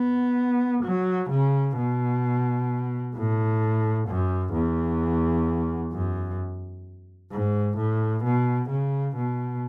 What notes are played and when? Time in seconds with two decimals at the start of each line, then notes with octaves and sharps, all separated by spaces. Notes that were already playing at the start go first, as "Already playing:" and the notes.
Already playing: B3
0.83 F#3
1.29 C#3
1.76 B2
3.14 A2
4.07 F#2
4.53 E2
5.92 F#2
7.31 G#2
7.77 A2
8.23 B2
8.69 C#3
9.16 B2